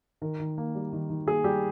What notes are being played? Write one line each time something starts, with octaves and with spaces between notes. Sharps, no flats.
D#3 A#4
D#3
A#3
G3
D#3
D#3
A#3 G#4
G3 G4